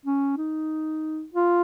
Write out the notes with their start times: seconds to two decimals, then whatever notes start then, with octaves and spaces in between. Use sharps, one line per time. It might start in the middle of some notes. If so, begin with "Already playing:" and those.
0.06 C#4
0.37 D#4
1.34 F4